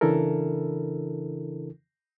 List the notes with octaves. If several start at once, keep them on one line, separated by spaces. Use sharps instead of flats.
C#3 E3 D4 E4 A4 A#4